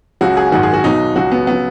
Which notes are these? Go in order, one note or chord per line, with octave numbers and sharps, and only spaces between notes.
C#2 C#3 F#3 F#4
G#4
G#1 F#2 D#3 F#4
G#4
F#4
B1 B2 F#3 D#4
C#2 C#3 F#3 F#4
B3
C#3 F#3 B3